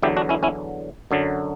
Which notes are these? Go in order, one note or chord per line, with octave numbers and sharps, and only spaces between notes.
E2 D3 F#3 E4 G4
D4 F#4
C#4 E4
C#4 E4
F#2 D3 F#3